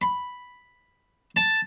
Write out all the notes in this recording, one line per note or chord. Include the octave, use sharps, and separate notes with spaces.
B5
A5